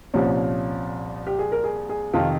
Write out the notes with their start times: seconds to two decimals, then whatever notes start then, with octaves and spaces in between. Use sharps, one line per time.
0.14 C2 A#2 F3 C#4
1.27 G4
1.39 G#4
1.52 A#4
1.64 G#4
1.89 G#4
2.13 F2 C3 D#3 F4